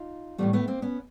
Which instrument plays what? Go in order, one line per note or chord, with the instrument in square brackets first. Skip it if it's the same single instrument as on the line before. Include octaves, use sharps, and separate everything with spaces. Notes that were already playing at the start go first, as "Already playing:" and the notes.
Already playing: [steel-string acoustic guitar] D#4 F4
A2 E3 G3 A3 B3
A3 B3
A#3 C4
B3 C#4